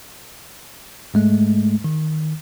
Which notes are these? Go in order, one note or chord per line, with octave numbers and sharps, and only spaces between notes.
G#2 G#3 A3
D#3